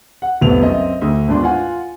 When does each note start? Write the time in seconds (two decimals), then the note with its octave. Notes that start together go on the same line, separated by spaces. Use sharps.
0.22 F#5
0.41 F1 C2 B3 F7
0.61 F#2 C4 D#5 E5
1.01 D2
1.28 G#1 E2 D4 C6
1.43 F4 F#5 G#5